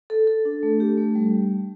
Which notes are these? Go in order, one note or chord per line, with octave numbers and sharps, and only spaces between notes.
A4
A4
D4
A3
G4
A3
G3